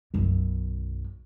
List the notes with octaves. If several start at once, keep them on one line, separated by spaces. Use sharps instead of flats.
B1 F#2